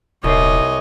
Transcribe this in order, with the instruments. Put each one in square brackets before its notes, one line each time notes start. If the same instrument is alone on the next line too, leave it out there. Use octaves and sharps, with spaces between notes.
[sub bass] D#1 [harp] C2 C7 [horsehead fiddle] C#5 D#5